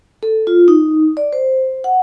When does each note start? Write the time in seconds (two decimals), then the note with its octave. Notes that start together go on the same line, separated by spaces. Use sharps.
0.23 A4
0.47 F4
0.68 D#4
1.17 D5
1.33 C5
1.84 F#5